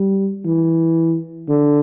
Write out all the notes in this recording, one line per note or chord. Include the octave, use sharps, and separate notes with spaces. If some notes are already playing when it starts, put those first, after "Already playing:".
Already playing: G3
E3
D3